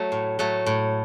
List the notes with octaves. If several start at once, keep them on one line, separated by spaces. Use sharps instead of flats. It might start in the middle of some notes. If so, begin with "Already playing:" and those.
Already playing: F#3 A3
A2
F#3 A3
A2